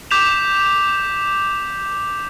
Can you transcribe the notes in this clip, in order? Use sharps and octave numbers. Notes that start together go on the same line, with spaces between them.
D6 G6 B6 E7 F7